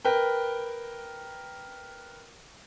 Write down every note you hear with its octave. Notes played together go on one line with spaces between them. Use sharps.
A#4 B4 G5